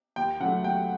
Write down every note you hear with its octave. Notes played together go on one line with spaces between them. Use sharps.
D#2 G5
C#3 F#3 A3 F#5
D#2 G5